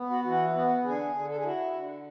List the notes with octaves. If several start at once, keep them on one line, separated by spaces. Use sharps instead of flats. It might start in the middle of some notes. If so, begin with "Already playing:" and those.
Already playing: B3
F#4
E3 F#4
B3 F#4
D3 G#4
D3
A4
G#4
E4 F#4
D3